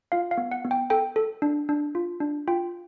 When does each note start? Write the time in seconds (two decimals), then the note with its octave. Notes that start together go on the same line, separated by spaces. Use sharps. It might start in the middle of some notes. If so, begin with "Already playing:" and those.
0.12 F4 F5
0.31 F5
0.38 B3
0.52 F#5
0.65 B3
0.71 G5
0.90 A4 G5
1.16 A4
1.42 D4
1.69 D4
1.95 F4
2.20 D4
2.48 F4 G5